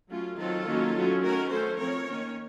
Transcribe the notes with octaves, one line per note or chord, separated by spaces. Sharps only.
F#3 A3 C#4 F4
D#3 F#3 C4 F4 A4
D#3 F#3 A#3 C#4
F#3 A3 C#4
D#3 A3 C#4 F#4 A#4
F#3 A3 C#4 A4 C5
F3 C4 A#4 C#5
D#3 A#3 C#4